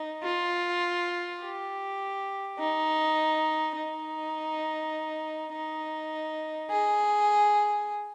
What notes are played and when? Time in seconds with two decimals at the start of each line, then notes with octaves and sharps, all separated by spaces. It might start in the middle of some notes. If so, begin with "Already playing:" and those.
Already playing: D#4
0.23 F4
1.41 G4
2.59 D#4
3.76 D#4
5.53 D#4
6.70 G#4